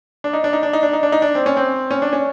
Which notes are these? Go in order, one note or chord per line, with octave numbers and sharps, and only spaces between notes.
D4
D#4
D4
D#4
D4
D#4
D4
D#4
D4
D#4
D4
C4
C#4
C4
C#4
D4
C#4